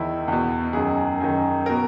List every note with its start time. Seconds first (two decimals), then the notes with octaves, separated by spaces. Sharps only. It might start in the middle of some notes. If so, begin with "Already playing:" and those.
Already playing: E2 D#3 E4
0.28 E2 B2
0.73 F#2 D#3 G#4
1.20 F#2 D#3
1.66 B2 A#4